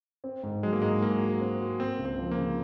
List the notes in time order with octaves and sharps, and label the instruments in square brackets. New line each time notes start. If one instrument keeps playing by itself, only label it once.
[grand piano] C4
G#2
[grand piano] F#3 [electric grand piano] G#3
[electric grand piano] A#3
[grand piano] G#2 [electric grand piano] G#3
[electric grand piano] A#3 [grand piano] F#4
[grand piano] F#4
C4
F#4
[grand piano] A#3 [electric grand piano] C4
[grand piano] C#2
[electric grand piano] C4
[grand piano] F3
[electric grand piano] A#3
[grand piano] C#3